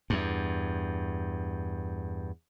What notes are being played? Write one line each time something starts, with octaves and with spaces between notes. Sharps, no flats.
E2 G2